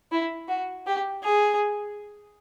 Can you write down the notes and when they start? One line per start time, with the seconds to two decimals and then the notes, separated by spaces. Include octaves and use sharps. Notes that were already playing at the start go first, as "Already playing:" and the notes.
0.12 E4
0.48 F#4
0.86 G4
1.23 G#4